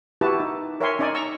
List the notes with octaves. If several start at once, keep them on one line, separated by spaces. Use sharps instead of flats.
E4 F#4 G4 B4 A5
D#4
A#4 C#5 E5 G5 G#5 C6
C#4 D#4 D5 D#5 G#5
A#5 C#6 E6